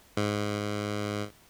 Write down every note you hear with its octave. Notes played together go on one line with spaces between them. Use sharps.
G#2